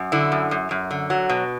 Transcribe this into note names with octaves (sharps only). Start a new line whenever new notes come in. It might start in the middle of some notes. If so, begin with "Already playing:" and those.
Already playing: F#2
D3 E4
F#2
F#2
F#2
D3
F#3
B2